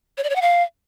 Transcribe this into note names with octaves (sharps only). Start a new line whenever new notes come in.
C#5
D5
C#5
F#5
F5